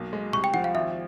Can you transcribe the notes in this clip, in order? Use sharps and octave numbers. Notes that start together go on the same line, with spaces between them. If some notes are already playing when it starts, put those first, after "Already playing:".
Already playing: B1 A#3
G#3
C2 C#6
G5
F3 F#5
F5
G#1 E5